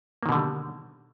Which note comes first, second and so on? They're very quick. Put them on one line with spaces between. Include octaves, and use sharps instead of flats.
A#3 D#3 B2 D3 G3